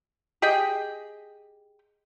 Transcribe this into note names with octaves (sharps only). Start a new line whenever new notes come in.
G4 G#4 D#5 G5